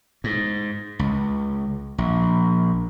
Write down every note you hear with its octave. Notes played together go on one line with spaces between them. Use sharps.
G#2
C#2
A#1